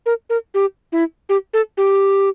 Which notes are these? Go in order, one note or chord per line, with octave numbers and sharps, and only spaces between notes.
A#4
A#4
G4
E4
G4
A4
G4